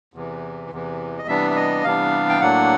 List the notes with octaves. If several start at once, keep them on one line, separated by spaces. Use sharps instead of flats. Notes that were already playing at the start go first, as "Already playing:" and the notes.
E2 C3 E3
E2 C3 E3
D#5
C3 E3 G3 B3 D4 E5
E5
D#5
C3 E3 G3 B3 D4 F5
G5
A2 F#3 A#3 D4 F#5